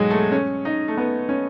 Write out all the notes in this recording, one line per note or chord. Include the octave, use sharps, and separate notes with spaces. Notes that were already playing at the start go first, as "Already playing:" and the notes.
Already playing: G#2 B2 F#3 G#3
A3
C#4
D#4
A3
B3
C#4